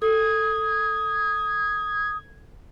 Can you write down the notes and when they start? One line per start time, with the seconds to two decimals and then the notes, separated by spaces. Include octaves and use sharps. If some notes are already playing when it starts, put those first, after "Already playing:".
0.02 A4 D#6 G#6